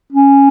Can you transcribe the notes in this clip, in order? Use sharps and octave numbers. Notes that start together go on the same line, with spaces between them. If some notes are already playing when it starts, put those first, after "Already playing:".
C#4